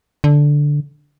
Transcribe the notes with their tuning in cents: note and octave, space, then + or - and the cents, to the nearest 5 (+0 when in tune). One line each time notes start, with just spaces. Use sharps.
D3 -5